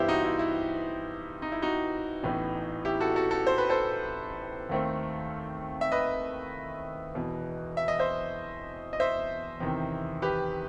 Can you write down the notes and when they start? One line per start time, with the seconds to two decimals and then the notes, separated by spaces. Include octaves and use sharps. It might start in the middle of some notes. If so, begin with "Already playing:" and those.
Already playing: G2 E3 B3 E4 G4 C5 E5
0.08 D#4 F#4
0.24 E4
0.39 E4
1.42 D#4
1.52 E4
1.62 D#4 F#4
2.23 A1 A2 E3 B3
2.85 E4 G4
3.00 F#4 A4
3.16 F#4 A4
3.31 F#4 A4
3.47 C5
3.58 B4
3.70 A4 C5
4.69 D#2 D#3 A3 C4
5.81 E5
5.92 B4 D#5
7.15 E1 E2 B2
7.77 E5
7.88 D#5
7.99 C5 E5
8.93 D#5
9.00 C5 E5
9.60 E2 C3 D#3
10.22 G4 B4